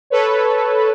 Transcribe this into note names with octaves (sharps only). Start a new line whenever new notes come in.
A4 B4 C#5